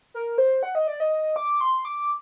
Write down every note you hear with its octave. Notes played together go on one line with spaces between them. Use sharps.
A#4
C5
F#5
D#5
D5
D#5
D6
C6
D6